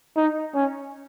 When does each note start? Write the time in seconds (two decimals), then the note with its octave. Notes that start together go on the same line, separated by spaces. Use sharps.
0.17 D#4
0.55 C#4